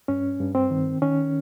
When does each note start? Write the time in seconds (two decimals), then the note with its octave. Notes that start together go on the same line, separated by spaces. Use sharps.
0.08 G2 C#4
0.40 G2
0.55 C4
0.70 D#3
1.02 D#3 C#4